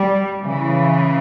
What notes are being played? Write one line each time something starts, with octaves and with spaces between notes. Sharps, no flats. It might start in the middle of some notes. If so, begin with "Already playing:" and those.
Already playing: G3
C#3 E3